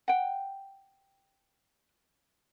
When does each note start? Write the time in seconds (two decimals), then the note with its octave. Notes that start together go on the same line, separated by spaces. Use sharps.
0.08 F#5 G5